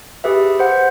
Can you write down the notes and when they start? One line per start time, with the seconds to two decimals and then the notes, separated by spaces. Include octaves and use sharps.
0.24 G4 G#4 B4 E5
0.59 C5 F#5